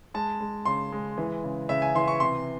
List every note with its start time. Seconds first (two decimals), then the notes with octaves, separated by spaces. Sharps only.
0.14 G#3 A5
0.40 G#3
0.65 C#3 C6
0.92 G#3
1.18 E3
1.44 C#3
1.69 C#3 E5
1.82 G#5
1.95 E3 C6
2.08 C#6
2.20 C3 C6